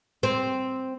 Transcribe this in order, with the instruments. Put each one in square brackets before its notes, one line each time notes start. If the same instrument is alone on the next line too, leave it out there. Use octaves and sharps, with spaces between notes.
[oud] C4